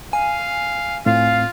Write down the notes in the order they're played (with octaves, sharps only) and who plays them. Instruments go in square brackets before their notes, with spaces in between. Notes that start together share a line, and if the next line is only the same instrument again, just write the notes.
[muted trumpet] F5 [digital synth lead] G#5
[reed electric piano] A2 C4 [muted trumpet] F4 [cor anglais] F5